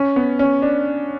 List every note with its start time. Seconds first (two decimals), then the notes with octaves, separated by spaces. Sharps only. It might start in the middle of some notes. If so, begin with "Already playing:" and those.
Already playing: C#4
0.16 B3
0.39 C#4
0.62 D4